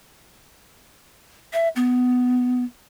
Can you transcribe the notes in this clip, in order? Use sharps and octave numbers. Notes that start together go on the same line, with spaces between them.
E5
B3